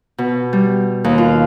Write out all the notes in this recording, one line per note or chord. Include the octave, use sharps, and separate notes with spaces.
B2
G3
D#2
F4